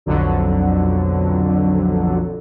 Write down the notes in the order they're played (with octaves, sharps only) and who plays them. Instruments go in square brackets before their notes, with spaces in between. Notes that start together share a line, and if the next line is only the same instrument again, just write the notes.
[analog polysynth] B1 F2 D3 F#3